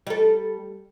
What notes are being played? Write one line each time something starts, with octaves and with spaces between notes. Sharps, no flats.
G3 A4